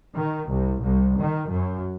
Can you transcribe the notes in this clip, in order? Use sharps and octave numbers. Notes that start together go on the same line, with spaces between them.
D#3
C2
C2
D#3
F#2